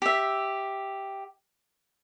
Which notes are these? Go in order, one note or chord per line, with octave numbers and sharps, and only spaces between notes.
G4 E5